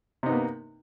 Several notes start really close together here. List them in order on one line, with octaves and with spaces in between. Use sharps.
C3 D#4 B3 A#3